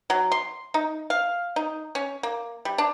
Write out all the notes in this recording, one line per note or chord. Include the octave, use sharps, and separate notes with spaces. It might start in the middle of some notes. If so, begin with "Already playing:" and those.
F#3
C6
D#4
F5
D#4
C#4
A#3
G3
D4